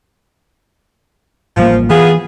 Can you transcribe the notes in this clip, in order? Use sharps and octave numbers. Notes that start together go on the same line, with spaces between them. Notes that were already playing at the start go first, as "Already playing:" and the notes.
A1 F3 G3 A#3
E3 B3 F4 G#4